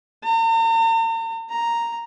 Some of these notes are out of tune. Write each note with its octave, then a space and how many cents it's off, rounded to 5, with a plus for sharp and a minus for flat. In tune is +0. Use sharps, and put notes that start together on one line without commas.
A#5 -45
A#5 +0